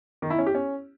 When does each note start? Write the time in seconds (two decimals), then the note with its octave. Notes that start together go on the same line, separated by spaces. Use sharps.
0.22 D#3
0.30 E4
0.38 C#4
0.46 G4
0.55 C#4